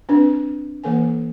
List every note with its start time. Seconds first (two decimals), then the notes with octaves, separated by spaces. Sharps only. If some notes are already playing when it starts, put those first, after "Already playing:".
0.09 C4 D4 B4
0.84 E3 A#3 A4 B4 G#5